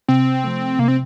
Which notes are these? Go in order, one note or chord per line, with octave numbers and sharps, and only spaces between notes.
C3 C4
F3 A3
C3 A#3
C4